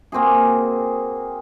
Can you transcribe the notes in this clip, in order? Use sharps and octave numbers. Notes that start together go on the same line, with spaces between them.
A#3 C4 F#4 G#4